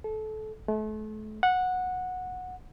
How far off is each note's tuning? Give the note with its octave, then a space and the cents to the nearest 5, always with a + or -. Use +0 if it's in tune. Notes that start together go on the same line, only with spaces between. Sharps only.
A4 -25
A3 -35
F#5 -10